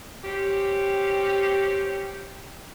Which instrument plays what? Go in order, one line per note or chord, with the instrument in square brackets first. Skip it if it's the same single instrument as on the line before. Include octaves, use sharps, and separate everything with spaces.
[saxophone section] C4 C#4 G4